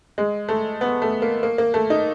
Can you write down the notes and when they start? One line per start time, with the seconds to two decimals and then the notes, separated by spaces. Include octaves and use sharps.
0.18 G#3
0.49 A3
0.81 B3
1.02 A3
1.22 A#3
1.43 A#3
1.58 A#3
1.74 A3
1.90 D#4